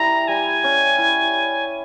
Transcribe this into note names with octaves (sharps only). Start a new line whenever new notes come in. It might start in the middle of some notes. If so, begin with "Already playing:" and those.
Already playing: G3 E4 A#5
G3 G#5
C#4
E4